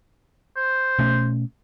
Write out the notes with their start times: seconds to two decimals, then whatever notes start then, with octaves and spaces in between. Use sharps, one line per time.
0.56 C5
0.99 B2 A3 C#4